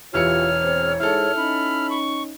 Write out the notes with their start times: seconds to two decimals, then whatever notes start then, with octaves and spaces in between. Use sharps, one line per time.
0.14 E1 E3 F4 G4 C#5 F6 C#7
0.61 E2 C4 C5
1.00 G#2 E4 A4 F6
1.36 C#4 D#4 B5
1.90 C#6